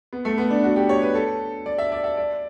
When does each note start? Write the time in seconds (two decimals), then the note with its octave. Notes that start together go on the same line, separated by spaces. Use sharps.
0.13 B3
0.25 A3
0.38 B3
0.50 D4
0.64 F#4
0.76 G4
0.89 C#5
1.02 B4
1.14 A4
1.66 D5
1.78 E5
1.92 D5
2.04 E5
2.17 D5